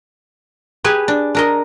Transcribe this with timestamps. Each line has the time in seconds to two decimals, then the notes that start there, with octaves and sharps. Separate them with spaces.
0.84 G4 G#4 B4 G#5
1.08 D4
1.35 D4 A#4 D#5